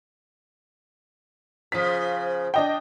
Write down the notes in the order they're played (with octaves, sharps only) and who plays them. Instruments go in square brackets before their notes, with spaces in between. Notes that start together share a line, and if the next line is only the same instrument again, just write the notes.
[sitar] C#3 F3 [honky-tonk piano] B6
[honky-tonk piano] D4 D#5 G5